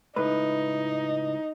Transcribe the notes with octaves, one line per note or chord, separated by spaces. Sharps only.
C#2 A2 D#4 B4